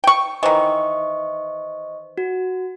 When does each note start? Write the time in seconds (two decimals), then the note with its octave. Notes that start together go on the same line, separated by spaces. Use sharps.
0.04 G5 C#6
0.43 D#3 E3 C5 D#5 C#6
2.18 F#4